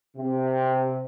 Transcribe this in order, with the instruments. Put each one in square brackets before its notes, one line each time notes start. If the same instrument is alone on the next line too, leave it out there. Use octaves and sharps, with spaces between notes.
[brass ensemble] C3